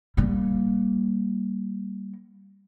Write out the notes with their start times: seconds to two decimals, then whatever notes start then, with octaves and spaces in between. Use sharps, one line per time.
0.17 G3 A#3